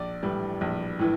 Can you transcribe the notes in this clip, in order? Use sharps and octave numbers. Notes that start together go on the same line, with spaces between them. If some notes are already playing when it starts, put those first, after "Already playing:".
Already playing: A#1 D5
A2 E3 G3
A#1
A2 E3